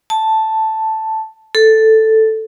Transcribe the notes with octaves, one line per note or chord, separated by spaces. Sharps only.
A5
A4